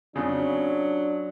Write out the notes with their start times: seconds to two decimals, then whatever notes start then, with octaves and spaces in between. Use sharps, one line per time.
0.16 F2 C#3 F#3 D4